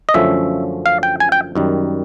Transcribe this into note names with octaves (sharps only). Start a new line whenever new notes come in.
D#5
F#2 D3 F3 A3 C#4 E5
F5
G5
G#5
G5
F#2 D#3 G3